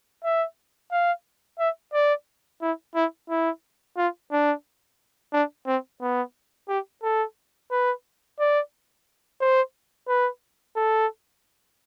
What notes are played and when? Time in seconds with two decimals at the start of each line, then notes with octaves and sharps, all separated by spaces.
0.24 E5
0.92 F5
1.59 E5
1.93 D5
2.62 E4
2.95 E4
3.30 E4
3.97 F4
4.32 D4
5.33 D4
5.67 C4
6.02 B3
6.69 G4
7.03 A4
7.71 B4
8.39 D5
9.41 C5
10.08 B4
10.76 A4